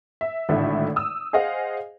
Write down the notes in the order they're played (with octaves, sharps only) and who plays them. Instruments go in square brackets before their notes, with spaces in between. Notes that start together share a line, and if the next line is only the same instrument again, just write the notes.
[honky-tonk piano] E5
G#1 A2 D3 A3 E5
D#6 E6
G#4 C5 D#5 F5 F#5